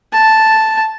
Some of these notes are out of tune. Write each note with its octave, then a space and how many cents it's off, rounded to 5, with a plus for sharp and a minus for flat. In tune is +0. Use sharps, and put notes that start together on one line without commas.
A5 +0